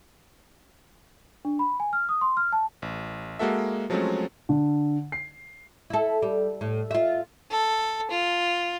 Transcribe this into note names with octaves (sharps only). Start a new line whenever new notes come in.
D4
B5
G#5
F6
D#6
C6
F6
A5
A1
G#3 A#3 F#4 A4 E5
F3 F#3 G#3 A3 C4 C#4
D3
C7
E4 A4
G3
A2
F4 E5
A4
F4